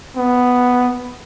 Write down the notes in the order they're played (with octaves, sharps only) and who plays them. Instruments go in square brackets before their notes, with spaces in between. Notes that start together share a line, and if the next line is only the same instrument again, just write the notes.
[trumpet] B3